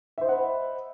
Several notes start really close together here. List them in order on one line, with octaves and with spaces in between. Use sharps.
E5 C5 D#5 F#5 B5